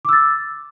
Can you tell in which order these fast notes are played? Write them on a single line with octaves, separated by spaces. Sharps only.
D6 E6 A6